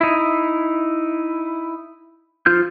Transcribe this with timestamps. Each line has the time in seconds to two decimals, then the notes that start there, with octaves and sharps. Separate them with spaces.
0.01 D#4 E4
2.46 F3 F4 F6 G6